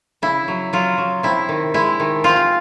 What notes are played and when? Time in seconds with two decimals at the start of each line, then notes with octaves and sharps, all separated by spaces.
0.22 C#3 E4
0.48 F#3
0.73 F#3 F4
0.98 F#3
1.23 C3 E4
1.49 D#3
1.74 G#3 E4
2.00 D#3
2.24 C4 F4